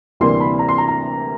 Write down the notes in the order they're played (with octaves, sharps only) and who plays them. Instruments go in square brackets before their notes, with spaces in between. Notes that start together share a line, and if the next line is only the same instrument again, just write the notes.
[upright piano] D2 C3 E3 G3 A#3 C6
B5
A#5
C6
A#5
A#5